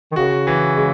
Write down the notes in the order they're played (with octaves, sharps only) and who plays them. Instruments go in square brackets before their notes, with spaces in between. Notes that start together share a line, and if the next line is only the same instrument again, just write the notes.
[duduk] D#3
[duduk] C#3 [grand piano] F#4
[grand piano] E3
G#3